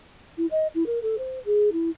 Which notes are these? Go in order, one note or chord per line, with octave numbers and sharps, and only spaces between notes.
E4
D#5
E4
A#4
A4
C5
G#4
E4